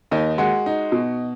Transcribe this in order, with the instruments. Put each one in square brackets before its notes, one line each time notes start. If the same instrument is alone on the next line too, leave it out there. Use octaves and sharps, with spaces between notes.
[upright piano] D#2 D#4 D#5
G#3 F#4 F#5
D#4
B2